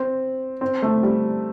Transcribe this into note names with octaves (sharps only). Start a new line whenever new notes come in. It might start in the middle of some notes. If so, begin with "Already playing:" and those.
Already playing: C4
C4
A3
G3